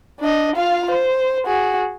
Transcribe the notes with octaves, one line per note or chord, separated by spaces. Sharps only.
D4 D#5
F4 F5
C5
F#4 G#4